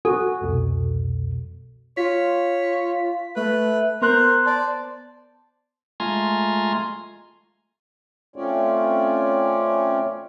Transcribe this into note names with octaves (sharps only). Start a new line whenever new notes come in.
F#4 A4 G#5
C2 F2 B2
F4 C#5 B6
A3 B4
B3 A#4 C5 C6 F#6
D5 A5
G#3 A3 F4 G#5 A#5 C6
A3 C4 C#4 F4 C#5 D5